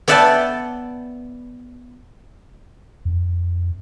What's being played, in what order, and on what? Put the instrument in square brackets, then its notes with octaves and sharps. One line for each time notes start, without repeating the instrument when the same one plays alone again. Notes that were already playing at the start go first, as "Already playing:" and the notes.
[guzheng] B3 D5 E5 F#5 G5 A5
[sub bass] F2